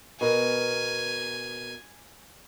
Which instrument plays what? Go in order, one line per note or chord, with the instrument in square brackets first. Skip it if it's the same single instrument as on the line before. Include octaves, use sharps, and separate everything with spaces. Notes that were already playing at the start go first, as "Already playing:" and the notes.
[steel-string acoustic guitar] B2 A#4 [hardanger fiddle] G#5